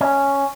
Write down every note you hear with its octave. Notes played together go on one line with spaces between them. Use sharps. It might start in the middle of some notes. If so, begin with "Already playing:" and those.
C#4